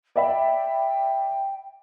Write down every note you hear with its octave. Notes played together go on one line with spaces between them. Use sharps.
D5 E5 G5 B5